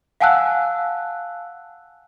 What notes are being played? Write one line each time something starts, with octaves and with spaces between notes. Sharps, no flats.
F5 F#5 G#5 A5 E6 F#6